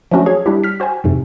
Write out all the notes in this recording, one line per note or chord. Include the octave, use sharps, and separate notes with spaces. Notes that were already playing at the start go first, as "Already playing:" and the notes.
F3 F#3 A3 C#4 D4 F#4
G#4 C#5 G#6
G3 D4 E4 G4
F6 B6
F#4 C5 G5 G#5
F2 G#2 C3